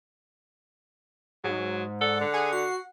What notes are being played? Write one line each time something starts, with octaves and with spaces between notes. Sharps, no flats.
G#2 F#3
A4 D5 F#5
D3
G#4 G#5
F#4 C7